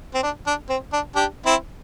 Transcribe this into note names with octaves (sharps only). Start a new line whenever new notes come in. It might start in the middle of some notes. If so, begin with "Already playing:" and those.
C4
D4
D4
C4
D4
D4 G4
C4 E4